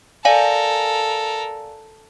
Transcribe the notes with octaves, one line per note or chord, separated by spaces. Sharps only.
A4 A#4 D5 F5 G#5